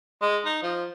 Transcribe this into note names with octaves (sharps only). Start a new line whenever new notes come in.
G#3
D#4
F3